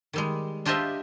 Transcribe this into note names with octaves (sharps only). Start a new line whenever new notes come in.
D#3 G3 G#3
D4 F4 G4 C5 D#5 E5